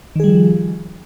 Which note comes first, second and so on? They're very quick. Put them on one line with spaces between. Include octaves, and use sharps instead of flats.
D#3 G#4 G3 F3